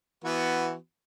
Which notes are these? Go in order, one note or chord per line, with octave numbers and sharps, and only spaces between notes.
E3 B3 F#4